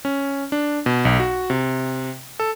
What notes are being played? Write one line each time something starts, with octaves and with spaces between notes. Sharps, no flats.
C#4
D4
B2
B1
F#4
C3
A4